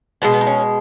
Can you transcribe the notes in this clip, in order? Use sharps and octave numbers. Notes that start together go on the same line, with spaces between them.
B2 G#3 B3
B3
D#4
C#4